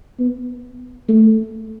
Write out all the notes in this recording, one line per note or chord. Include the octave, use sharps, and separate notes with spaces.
B3
A3